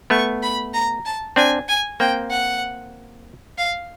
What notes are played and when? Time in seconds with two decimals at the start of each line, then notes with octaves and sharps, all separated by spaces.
0.10 A3 B3 C#6
0.43 B5
0.74 A#5
1.05 A5
1.36 C4 D4 G#5
1.68 G#5
2.00 A#3 C4 G5
2.31 F#5
3.58 F5